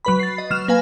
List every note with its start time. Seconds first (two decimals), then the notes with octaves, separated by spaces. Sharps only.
0.05 F#3 B4 B5
0.19 A6 C7
0.38 D#5
0.51 F#3 F6 E7
0.68 A#3 B4 F5 G#5